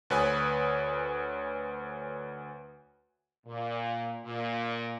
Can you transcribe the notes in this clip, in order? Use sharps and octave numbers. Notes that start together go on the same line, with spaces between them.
D2 B4 C#5 G#5 D#6
A#2
A#2